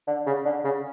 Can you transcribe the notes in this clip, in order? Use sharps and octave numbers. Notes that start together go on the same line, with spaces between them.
D3
C#3
D3
C#3